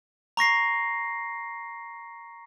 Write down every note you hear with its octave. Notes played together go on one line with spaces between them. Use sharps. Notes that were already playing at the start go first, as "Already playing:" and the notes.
A#5 C#6 A#6 C7